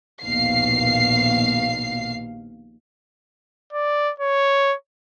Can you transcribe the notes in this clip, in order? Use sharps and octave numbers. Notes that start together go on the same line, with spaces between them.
A#1 D#2 B2 F5 C7
D5
C#5